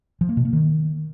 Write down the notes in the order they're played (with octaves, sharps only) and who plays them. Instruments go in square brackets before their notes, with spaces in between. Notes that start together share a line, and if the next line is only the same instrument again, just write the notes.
[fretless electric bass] F3
A#3
B2
A#3
D#3